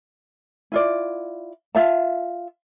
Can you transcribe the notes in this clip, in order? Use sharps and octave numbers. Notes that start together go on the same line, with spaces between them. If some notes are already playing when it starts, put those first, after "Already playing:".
E4 F4 D5
F4 E5 A5